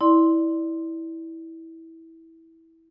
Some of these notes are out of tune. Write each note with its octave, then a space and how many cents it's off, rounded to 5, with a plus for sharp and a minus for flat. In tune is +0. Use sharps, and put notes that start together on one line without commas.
E4 -15 D5 +5 C6 +0